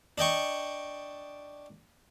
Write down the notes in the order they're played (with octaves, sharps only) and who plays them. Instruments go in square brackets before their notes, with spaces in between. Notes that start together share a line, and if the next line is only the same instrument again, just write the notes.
[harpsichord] D4 D#5 G5 C#6